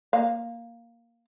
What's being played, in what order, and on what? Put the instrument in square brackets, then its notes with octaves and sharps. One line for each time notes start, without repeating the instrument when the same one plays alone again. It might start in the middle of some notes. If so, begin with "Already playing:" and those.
[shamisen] A#3 F5